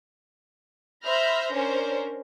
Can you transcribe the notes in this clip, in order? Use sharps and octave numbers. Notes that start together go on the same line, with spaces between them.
C5 E5 B5 F6 G6 A#6
C#4 D4 A#4 C5